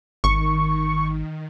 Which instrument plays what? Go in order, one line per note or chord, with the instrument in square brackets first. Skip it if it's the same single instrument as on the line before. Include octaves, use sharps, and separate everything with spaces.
[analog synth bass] G#1 [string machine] D#3 [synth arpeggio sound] C#6